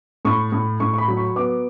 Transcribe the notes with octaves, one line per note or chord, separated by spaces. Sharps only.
A2 C#6
A2
A2 C#6
C#6
B5
F#3
C#6
B3 D6